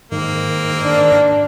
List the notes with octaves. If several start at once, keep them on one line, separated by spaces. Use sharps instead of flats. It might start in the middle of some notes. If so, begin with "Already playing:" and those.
G#2 D#3 A#3 C4
D4